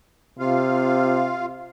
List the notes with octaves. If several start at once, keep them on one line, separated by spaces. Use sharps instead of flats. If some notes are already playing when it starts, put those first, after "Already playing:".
C3 F4 F5